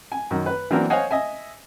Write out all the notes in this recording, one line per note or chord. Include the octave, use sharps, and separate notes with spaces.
G#5
F#2 D#3
B4
E3 F#3 A#3 C4 D4 A#4
C5 C#5 D#5 F5 F#5 G#5
D#5 E5 G#5